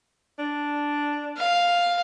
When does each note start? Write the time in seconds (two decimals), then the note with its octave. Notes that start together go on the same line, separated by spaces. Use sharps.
0.39 D4
1.37 F5